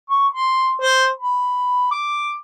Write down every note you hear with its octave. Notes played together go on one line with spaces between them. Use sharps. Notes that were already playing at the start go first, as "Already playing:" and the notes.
C#6
C6
C5
B5
D6